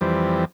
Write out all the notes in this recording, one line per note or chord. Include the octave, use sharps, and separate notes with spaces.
F2 E3 G3 C4